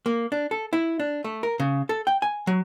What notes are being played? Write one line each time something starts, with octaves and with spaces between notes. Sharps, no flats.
A#3
D4
A4
E4
D4
A3
A#4
C#3
A4
G5
G#5
F#3